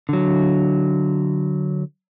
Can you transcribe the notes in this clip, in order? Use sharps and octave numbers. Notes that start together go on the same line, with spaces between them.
D3 F#3